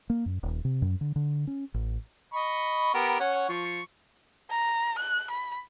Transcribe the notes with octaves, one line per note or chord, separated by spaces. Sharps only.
A#3
F#2
D#1
C3
F#2
D3
D3
C#4
A1
D#5 B5 C#6
B3 G4 A#4
C#4 C#5 F#5
F3 C#6
A#5
F#6
B5